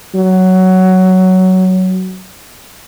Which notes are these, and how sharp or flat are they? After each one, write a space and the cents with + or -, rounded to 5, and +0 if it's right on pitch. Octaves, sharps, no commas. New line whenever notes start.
F#3 +10